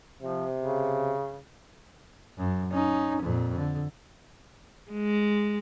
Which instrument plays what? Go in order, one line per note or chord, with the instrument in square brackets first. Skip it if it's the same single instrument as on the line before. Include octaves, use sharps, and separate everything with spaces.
[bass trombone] C3 [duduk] F3
[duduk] C#3
[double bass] F#2
C#4 D#4
F2 A#2
D3
[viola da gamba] G#3